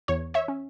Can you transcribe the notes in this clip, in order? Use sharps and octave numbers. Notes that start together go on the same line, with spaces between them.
E2 C#5
C#5 E5
C#4